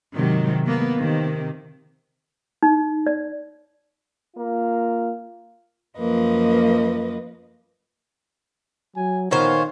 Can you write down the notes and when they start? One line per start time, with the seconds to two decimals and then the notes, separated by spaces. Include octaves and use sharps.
0.16 G#2 C3 D#3 F#3
0.65 A#3 B3
0.98 C3 D#3
2.63 D#4
3.07 D5
4.36 A#3 F4
5.98 F#2 F3 A#3 B4 D#5
8.96 F#3 G#5
9.31 A#2 D#3 B3 F4 C5 C#5